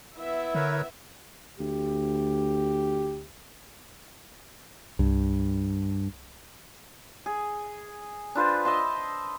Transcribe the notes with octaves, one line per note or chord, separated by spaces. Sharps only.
B3 E4 E5
D3 A#4 B4 C#5
D2 G4
C2 G2
G#4
D4 F4 B4 C5
D#5 E5 A5 C6